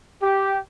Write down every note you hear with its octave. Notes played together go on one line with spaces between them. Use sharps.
G4